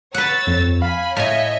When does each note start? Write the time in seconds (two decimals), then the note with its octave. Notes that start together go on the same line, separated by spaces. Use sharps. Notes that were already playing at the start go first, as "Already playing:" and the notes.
0.14 B4 C#5 F#5 E6 A6
0.47 F2
0.82 F5 G#5 B5
1.16 A2 C#5 D#5 E5 G#5